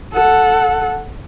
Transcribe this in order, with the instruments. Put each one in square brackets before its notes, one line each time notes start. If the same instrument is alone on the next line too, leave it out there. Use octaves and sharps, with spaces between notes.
[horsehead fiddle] A4 F#5